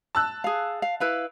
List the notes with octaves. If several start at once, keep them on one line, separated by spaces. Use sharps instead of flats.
A5 E6 F#6
G#4 F5
F5
E4 B4 F5